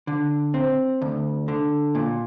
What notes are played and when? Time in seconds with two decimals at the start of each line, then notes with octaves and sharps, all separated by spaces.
0.07 D3
0.54 C4
1.01 D2
1.48 D3
1.95 A#2